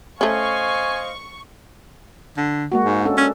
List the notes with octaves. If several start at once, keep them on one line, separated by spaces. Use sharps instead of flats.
A3 C#4 C5 D#5 F5 G#5 C#6
D3
G#3 A#3 F#4
G#2
C#4 D4 A4
C#4 D4